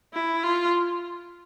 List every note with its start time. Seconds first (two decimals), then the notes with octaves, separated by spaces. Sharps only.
0.14 E4
0.43 F4